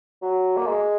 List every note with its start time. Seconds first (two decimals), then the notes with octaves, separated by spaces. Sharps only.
0.22 F#3
0.57 A#3
0.66 G#3